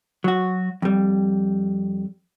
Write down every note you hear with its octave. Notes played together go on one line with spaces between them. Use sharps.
F#3 F#4
F2 G3